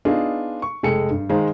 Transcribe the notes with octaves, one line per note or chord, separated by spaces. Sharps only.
B3 D4 D#4 F4 G#4
C#6
F1 G#3 A4 G5 C#7
G2
D#3 G#3 C5 F5 G#5 A#5